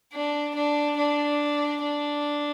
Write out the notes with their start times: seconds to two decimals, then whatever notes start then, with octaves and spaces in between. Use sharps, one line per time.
0.13 D4
0.55 D4
0.97 D4
1.82 D4